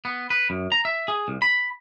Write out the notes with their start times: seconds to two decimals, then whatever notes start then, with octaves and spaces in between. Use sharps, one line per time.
0.05 B3
0.30 B4
0.50 F#2
0.72 A#5
0.85 E5
1.08 G#4
1.28 C2
1.42 B5